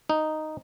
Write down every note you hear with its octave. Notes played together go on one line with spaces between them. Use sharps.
D#4